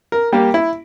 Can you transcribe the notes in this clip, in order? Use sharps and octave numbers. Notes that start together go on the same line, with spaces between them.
A#4
G3 A#3 G4
E4